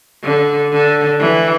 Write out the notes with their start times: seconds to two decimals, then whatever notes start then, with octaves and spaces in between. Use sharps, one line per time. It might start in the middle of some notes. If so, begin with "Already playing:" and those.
0.24 D3
0.72 D3
1.19 E3